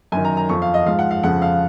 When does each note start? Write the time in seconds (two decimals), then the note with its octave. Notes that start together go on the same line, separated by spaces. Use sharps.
0.12 F#2 G#5
0.17 D#3
0.25 A#5
0.37 A#5
0.49 F2 F3 C#6
0.62 F5
0.74 D#5
0.86 G#2 F3 F5
0.99 F#5
1.11 F5
1.23 F2 C#3 F3 F#5
1.42 F5